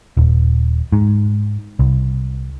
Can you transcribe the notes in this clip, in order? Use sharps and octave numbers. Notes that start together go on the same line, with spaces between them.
D#1
G#2
C2